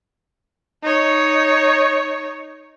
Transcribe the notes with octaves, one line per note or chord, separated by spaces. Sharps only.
D#4 C#5